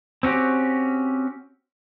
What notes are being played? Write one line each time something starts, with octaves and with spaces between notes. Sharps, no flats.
C4 C#4 F#4 G4